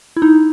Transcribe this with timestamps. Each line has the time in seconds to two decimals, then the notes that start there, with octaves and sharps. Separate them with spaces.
0.16 E4
0.22 D#4